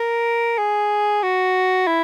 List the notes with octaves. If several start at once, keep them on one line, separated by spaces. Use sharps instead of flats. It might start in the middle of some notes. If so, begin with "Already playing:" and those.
Already playing: A#4
G#4
F#4
E4